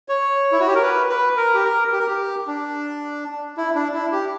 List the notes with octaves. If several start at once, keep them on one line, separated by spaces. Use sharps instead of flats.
C#5
E4
F#4
G4
A#4
B4
B4
A#4
G4
A#4
G4
A#4
G4
D4
E4
D4
E4
G4